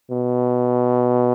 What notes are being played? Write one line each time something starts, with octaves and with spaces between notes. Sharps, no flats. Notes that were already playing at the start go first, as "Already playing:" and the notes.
B2